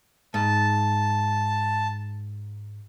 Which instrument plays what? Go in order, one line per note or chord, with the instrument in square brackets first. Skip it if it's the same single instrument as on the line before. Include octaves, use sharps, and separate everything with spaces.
[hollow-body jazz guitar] G#2 [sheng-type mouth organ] A5